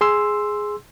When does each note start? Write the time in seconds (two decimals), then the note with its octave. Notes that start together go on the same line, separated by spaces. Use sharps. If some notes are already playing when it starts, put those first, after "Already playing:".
0.01 G#4 C6 E6